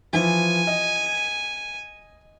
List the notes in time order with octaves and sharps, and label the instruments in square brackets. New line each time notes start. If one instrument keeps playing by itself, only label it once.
[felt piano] E3 F3 [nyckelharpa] G#5
[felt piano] D#5